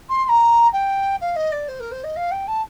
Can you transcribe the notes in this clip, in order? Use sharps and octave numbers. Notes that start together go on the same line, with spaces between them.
C6
C6
A#5
G5
F5
D#5
D5
C5
A#4
C5
D#5
F5
G5
A5